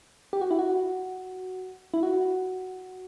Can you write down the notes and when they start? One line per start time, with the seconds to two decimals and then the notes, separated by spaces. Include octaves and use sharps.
0.33 G4
0.41 F#4
0.51 E4
0.59 F#4
1.94 E4
2.03 F#4